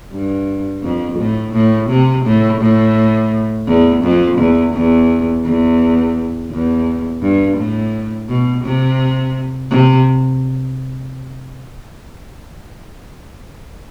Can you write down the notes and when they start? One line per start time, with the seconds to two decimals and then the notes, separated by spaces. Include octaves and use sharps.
0.12 G2
0.83 F2
1.19 A2
1.53 A2
1.89 C3
2.25 A2
2.60 A2
3.67 E2
4.03 F2
4.38 E2
4.74 E2
5.44 E2
6.51 E2
7.22 G2
7.57 A2
8.28 B2
8.64 C3
9.70 C3